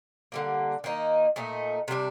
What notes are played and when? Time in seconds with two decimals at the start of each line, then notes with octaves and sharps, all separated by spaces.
0.32 D3 G3 A#3
0.84 D#3 A#3 D#4
1.36 A#2 A3 D#4
1.88 C3 G3 D4